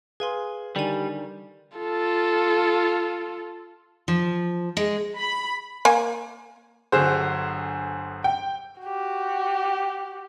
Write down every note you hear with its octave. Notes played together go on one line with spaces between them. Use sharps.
G#4 B4 F5 G#5 C6
D3 D#3 G3 A#4 D5 G#5
F4 A4
F3
G#3
B5
A#3 G#5
G1 D3 F#3 G#4 C5
G5
F#4 G4